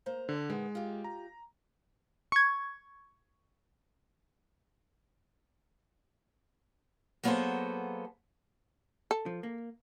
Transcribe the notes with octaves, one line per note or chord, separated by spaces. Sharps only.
A#3 C5 A#5
D3
A#2 D#3 G#3 B3
F4 G4
A#5
C#6 G#6
F#3 A#3 B3 G#4 A4 C5
A4
F3
A#3